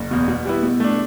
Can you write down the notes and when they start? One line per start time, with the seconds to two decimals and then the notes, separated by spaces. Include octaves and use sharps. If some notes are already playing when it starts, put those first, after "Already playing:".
Already playing: F#1
0.11 E2 B2
0.28 B2
0.46 G3 B3 E4
0.63 B2
0.80 A3 D4